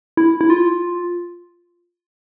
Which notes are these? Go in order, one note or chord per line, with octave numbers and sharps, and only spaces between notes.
E4
E4
F4